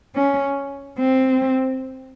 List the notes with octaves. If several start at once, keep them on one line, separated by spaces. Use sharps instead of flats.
C#4
C4